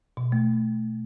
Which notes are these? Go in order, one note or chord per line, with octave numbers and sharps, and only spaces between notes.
B2
A3